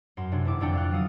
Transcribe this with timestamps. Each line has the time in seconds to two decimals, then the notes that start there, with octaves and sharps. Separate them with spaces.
0.17 F#2 C6
0.32 C3 D4 C#5
0.45 G#1 E4 D6
0.60 F2 D3 D4 G5 C#7
0.73 D5 F5 F#6
0.91 F#3 A4 F5 D#6 D7